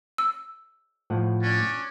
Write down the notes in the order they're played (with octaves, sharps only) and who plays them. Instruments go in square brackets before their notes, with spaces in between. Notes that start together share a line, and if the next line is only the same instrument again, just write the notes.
[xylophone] E6
[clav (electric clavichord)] A2 F3 F#5
[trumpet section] C#4 D4 D5